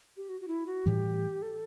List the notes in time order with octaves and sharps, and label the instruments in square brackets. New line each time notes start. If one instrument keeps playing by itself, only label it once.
[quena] G4
F#4
F#4
E4
F#4
[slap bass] A2 E3 G3 [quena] G4
[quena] A4